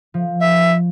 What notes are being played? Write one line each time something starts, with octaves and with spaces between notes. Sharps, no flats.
F3
E5